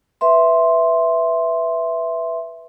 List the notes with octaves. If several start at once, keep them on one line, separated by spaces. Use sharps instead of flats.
B4 E5 C6